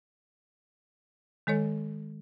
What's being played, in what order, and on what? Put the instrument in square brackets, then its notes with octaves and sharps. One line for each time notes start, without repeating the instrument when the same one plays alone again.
[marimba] D#3 G#3 A4 C#5